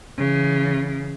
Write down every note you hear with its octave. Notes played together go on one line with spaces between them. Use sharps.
C#3 E3